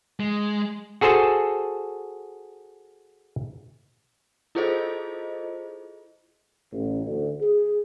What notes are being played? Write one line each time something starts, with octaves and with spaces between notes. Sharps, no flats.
G#3
F#4 G#4 A4 C5 A5
E4 F4 G#4 A4 C5 D#5
A1
D2
G#4